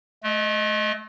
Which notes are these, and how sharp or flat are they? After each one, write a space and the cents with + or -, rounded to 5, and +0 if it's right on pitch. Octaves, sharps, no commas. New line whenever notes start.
A3 -30 D#5 +0